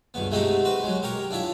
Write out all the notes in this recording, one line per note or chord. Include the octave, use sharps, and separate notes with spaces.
C#2 G2 B3
G#3 A3 C4 D#4 F#4 G4
F#4 B4 C6
F#3 G#3
G4 A#4 C#5 C#6
D4 E4 F4 C#5